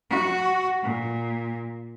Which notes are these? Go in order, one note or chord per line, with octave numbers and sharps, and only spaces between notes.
F#4
A#2